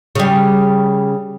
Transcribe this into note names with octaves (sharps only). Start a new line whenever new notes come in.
C#3 G3